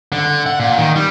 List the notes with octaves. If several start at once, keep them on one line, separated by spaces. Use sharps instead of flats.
D3
F#5
A#2
D#3
G3